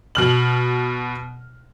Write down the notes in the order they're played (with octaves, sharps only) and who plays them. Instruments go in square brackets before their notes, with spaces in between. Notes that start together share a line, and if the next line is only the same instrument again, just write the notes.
[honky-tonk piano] B2 F6 F#7